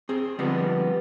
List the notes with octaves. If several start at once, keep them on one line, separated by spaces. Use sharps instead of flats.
C4 G#4
D3 F3 G3 G#3 B3 C4